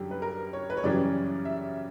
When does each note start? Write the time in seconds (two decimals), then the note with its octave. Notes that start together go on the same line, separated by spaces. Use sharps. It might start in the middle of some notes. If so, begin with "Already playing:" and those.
Already playing: F#2 D3 G3 G4
0.11 B4
0.22 A#4
0.53 C#5
0.70 B4
0.77 C#5
0.84 F#2 C#3 E3 G3 D5
1.45 E5